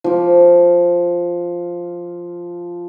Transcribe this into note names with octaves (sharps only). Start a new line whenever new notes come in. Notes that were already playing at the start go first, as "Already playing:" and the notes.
F3 D6